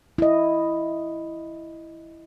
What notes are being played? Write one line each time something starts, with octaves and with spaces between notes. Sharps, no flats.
E4 D#5